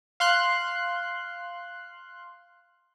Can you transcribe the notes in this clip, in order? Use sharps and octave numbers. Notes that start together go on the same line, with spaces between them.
F5 C6 F#6